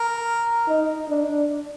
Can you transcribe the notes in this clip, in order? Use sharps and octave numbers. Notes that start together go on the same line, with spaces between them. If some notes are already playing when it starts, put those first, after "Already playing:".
Already playing: A#4
D#4
D4